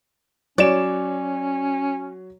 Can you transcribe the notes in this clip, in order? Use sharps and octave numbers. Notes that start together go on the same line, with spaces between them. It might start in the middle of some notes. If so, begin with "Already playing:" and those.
F#3 C#4 C#5 D5 E7